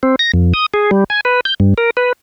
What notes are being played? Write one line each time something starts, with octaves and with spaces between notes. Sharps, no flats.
C4
A#6
F2
D#6
G#4
G3
G#5
B4
G6
G2
A#4
B4